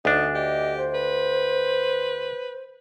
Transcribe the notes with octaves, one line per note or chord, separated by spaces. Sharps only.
D2 D4 D#4
G4 D#5
C5
B4